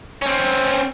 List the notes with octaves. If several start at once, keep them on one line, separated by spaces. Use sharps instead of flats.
C4 C#4